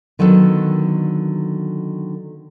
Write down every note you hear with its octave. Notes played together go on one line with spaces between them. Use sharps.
D3 D#3 F#3 B3 A4